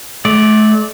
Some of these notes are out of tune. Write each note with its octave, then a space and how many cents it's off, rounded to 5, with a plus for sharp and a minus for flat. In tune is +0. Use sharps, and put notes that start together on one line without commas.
A3 -40 D5 +0